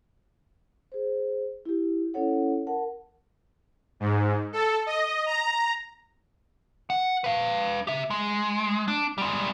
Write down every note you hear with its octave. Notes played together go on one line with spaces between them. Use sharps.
G#4 C5
E4 G4
C#4 E4 A4 C#5 F#5
A#4 F#5 A5
G#2
A4
D#5
A#5
F#5
B4 F5
G4 E5
G#3
D4
G3 G#3